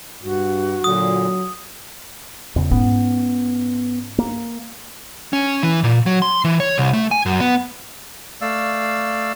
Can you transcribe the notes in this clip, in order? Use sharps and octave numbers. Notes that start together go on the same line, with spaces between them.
G2 F#4
A#2 D3 F#3 D#6
E2 C#3
G#2 B3 C#4
A#3
C#4
E3
A#2
F#3
C6
E3
C#5
C2
A3
G#5
F#2
B3
A3 D5 F5 E6